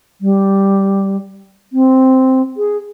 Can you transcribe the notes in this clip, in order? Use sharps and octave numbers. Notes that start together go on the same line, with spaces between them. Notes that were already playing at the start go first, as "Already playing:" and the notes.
G3
C4
G#4